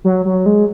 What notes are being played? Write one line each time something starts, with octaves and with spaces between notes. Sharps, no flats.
F#3
F#3
G#3